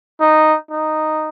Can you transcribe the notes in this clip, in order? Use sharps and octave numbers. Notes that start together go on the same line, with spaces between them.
D#4
D#4